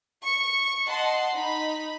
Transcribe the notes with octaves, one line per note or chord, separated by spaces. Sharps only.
C#6 C#7
D#5 F#5 A5 C6
D#4 B5